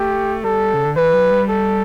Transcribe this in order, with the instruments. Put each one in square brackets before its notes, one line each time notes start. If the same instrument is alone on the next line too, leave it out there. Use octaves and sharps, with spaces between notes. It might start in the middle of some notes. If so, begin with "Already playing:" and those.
Already playing: [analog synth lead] A3 [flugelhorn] G4
[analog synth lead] G3 [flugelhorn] A4
[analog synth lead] C#3
D3
[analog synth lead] E3 [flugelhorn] B4
[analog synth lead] F#3
G3
[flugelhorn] A4